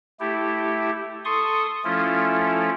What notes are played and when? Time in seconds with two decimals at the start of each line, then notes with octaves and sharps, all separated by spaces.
0.20 A3 E4 G4
1.25 A4 C6 C#6 D#6
1.84 F3 A3 C#4 E4 F4 A4